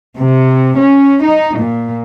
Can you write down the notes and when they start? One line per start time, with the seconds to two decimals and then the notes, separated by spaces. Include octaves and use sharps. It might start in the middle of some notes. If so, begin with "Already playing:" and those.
0.19 C3
0.79 C#4
1.23 D#4
1.59 A#2